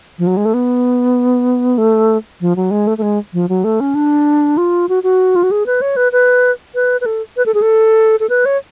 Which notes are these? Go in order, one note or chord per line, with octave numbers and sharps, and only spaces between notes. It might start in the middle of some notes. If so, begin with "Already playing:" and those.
F3
F#3
G#3
A3
B3
A3
F3
F#3
G#3
A3
A3
G#3
F3
F#3
A3
C#4
D4
F4
F#4
F#4
F4
F#4
G#4
B4
C#5
B4
B4
B4
B4
A4
B4
A4
G#4
A4
A4
B4
C#5